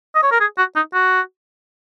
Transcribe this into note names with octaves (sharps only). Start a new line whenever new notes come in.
D#5
C#5
A#4
G#4
F#4
D#4
F#4